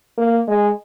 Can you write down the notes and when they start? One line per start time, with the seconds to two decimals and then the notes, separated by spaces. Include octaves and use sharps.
0.18 A#3
0.48 G#3